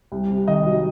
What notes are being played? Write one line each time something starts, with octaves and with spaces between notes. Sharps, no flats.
C2
C3
D#3 D#5
F#3